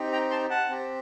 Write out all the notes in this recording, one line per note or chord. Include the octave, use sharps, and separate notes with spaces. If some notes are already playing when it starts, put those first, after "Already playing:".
Already playing: C4 D#4 G4
G5 A#5
A5 C6
F#5 A5
C4 G4